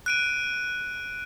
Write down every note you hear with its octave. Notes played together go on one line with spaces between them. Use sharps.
F#6 D7 D#7